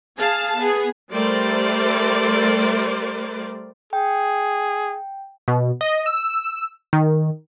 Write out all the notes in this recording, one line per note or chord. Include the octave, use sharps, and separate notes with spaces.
G#4 F5 A5
B3 G#4
G3 A3 A#4 C5 D5
G#4 G5
B2
D#5
E6
D#3